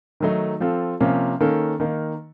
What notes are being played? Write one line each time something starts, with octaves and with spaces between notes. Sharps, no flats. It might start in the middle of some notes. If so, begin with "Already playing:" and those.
D#3 F#3 A3 D#4
F3 C4 F4 A4
C3 F3 A#3 C#4 F4
D#3 A#3 C#4 A4
D#3 A#3 D#4